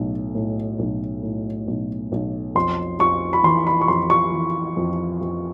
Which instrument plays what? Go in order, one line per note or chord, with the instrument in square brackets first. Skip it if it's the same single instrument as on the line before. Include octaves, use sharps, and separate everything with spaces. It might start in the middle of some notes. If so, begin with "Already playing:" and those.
Already playing: [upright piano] B1 A2
A2
B1
A2
B1
B1
F2 C6
F2 C#6
B5
E3 C6
B5
C#6
F2 C6
C#6
E3
F2
F2